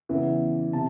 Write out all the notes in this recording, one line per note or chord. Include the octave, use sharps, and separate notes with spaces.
E2 C#3 E3
C3 A5